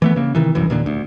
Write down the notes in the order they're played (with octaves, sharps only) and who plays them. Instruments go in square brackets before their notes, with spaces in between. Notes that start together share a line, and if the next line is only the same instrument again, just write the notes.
[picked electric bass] E3 A3 B3
C#3 A#3
C3 D#3 E3
E1 C2 F#2 E3
D#2 A#2 D3
D2